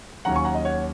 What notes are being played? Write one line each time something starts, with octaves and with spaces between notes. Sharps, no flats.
D#2 D#3 F#3 C#4 F#5 A#5
G#5 C#6
F#5 A#5
D#5
C#5 F#5